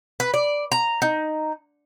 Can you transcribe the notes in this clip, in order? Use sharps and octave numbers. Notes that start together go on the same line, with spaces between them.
B4
D5
A#5
D#4